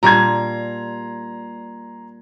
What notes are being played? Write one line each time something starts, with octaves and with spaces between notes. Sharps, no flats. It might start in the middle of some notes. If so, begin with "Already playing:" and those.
A#2 G3 D4 A#5 C6 G#6